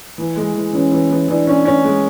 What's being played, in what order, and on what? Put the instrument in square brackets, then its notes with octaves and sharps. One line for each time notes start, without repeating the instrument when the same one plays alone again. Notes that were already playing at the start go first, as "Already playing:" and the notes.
[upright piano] E3
G#3
E3
[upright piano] E3 [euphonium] C#4
[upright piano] E3
E3
[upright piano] E3 [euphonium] D4
[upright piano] C#4
C#4
G#3